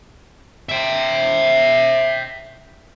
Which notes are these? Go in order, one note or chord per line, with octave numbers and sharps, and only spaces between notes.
E5 G5